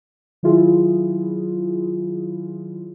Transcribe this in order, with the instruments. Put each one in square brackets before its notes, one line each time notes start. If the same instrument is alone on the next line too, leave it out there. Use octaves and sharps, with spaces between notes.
[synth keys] D#3 F#3 E4 F4 G#4